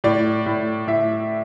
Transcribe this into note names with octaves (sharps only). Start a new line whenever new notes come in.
A2 D5
A2
A2 E5